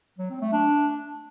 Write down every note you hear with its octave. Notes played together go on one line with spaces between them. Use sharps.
F#3
C4
A3
D4